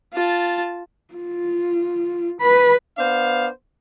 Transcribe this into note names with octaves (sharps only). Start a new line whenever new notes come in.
F4 A5
F4
B4 B5
B3 D4 C5 F5